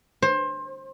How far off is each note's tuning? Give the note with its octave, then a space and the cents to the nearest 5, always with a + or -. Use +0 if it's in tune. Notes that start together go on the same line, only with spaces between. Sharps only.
C5 +25